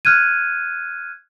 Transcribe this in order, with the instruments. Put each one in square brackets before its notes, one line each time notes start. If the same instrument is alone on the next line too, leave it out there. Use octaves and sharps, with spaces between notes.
[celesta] F6 F#6 G#6 D#7